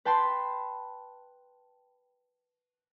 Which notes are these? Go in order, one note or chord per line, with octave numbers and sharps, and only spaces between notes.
B4 G5 A5 B5 C6